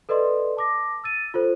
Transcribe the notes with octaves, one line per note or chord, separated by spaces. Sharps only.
A4 B4 D5 D#5 C6
A5 D6 A#6
E6 A6 D#7
F4 A4 C5